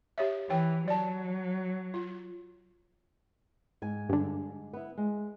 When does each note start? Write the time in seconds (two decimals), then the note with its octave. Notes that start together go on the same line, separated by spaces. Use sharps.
0.18 G4 C#5 E5
0.50 E3 C#5 G5
0.88 F#3 D5 A5
1.94 F4
3.82 G#2 G#5
4.09 G2 D3
4.73 B3 E4
4.98 G#3